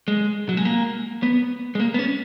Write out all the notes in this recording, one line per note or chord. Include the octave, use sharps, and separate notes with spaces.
G#3
F#3
G#3
A#3
B3
G#3
A#3
B3
C#4